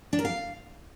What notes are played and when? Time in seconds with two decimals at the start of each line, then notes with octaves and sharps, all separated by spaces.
0.13 D4
0.19 A#4
0.25 F5